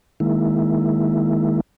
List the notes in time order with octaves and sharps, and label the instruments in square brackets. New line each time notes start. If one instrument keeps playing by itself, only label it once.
[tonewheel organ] D#3 G#3 A#3 E4